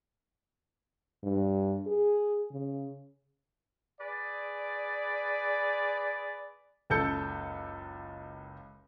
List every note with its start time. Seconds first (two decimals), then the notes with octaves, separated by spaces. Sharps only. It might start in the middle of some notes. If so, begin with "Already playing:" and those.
1.24 G2
1.87 G#4
2.52 C#3
4.01 G#4 B4 D5
6.90 F#1 C#2 A4 G6 C#7